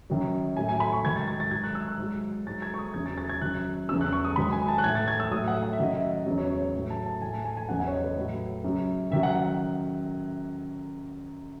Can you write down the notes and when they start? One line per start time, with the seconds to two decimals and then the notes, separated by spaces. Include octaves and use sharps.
0.10 F#2 D#3 F#3
0.57 A2 F#3 G#5
0.69 G#5
0.80 B5
0.92 C#6
1.04 G#2 D#3 F#3 G#6
1.16 A6
1.28 A6
1.40 A6
1.51 G#2 F#3 G#6
1.63 F#6
1.75 E6
1.88 F#6
1.99 G#2 F#3
2.47 G#2 F#3 A6
2.62 G#6
2.74 C#6
2.79 D#6
2.94 E2 C#3 F#3 G#6
3.06 A6
3.18 A6
3.29 G#6
3.41 F#2 D#3 F#3 F#6
3.89 E2 C#3 F#3 E6
4.01 F#6
4.13 C#6
4.24 D#6
4.36 G#2 D#3 F#3 B5
4.52 G#5
4.68 A5
4.78 F#6
4.84 A2 E3 G#6
4.95 A6
5.08 G#6
5.20 E6
5.31 A2 F#3 D#6
5.48 F#5
5.63 F#5
5.73 E5
5.79 F#2 D#3 F#3 D#5
5.93 E5
6.26 E2 C#3 F#3
6.38 C#5
6.50 C#5
6.62 C#5
6.74 A2 F#3
6.90 A5
7.06 A5
7.21 A2 E3 G#5
7.33 A5
7.45 G#5
7.57 G#5
7.69 E2 C#3 F#3 F#5
7.80 F#5
7.87 C#5
7.92 D#5
8.04 B4
8.16 A2 F#3
8.64 F#2 C#3 F#3
9.11 F#2 D#3 F#3 E5
9.23 F#5
9.35 F#5